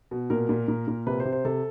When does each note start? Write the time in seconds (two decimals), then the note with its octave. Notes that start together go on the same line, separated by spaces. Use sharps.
0.11 B2
0.30 A#2 A#4
0.49 A#2
0.68 A#2
0.88 A#2
1.07 C3 B4
1.20 C5
1.25 C3
1.32 C5
1.45 C3 A4